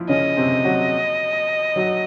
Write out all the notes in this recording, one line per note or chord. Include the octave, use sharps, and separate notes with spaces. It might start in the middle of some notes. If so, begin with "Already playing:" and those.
Already playing: F3 E4 F4
C#3 C#4 D#5
C3 C4
F#3 F#4
F#3 F#4